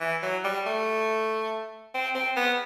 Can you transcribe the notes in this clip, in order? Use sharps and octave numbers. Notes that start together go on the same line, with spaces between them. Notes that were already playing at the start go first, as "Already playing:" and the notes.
E3
F#3
G3
A3
C4
C4
B3